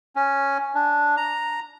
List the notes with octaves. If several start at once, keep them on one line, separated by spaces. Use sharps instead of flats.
C#4
D4
A#5